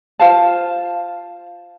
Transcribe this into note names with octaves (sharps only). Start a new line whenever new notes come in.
F4 C5 F5 A5